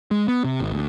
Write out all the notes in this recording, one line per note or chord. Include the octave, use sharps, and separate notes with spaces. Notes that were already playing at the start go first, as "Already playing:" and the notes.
G#3
B3
C3
G#1
D2